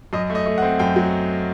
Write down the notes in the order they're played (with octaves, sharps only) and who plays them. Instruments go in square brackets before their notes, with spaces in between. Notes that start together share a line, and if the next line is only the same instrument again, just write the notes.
[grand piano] F#2 D#5
A3
D#5
A3
F#5
C4
F#2 G5
F#3